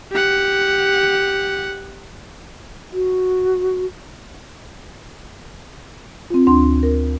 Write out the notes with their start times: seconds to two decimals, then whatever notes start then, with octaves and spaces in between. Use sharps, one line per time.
0.12 G4 F#5
2.93 F#4
6.30 C4 F4
6.47 D2 D4 C6
6.83 A#4